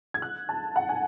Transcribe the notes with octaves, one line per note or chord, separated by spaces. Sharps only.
G#6
F#6
A5
F#5
G#5